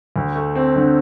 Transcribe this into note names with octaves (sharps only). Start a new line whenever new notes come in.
D2
A3
C4
D3